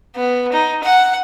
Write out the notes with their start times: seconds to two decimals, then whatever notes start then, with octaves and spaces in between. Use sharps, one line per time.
0.16 B3
0.52 D#4
0.83 F#5